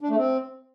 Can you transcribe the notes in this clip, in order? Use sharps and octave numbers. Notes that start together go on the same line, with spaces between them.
D4
A3
C4